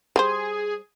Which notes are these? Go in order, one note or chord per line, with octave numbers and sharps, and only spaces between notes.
G3 G4 G#4 C5